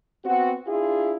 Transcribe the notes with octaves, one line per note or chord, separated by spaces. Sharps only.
B3 C4 F#4
D4 E4 F4 G#4